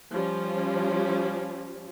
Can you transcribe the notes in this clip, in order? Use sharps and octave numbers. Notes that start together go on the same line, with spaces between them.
F3 G3 C#4